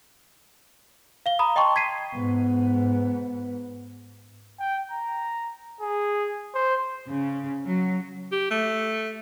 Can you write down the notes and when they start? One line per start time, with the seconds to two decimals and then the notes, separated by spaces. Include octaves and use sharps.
1.26 F5 G7
1.39 A#5 B5 D#6
1.56 D#5 G5 A5 C6 C#6
1.76 G#6 B6 C7 D#7
2.14 G#2 B3
4.60 G5
4.92 A#5
5.81 G#4
6.55 C5
7.08 C#3
7.65 F#3
8.32 G4
8.51 A3